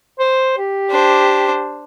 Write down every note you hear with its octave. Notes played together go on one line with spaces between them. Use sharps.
C5
G4
D4 C5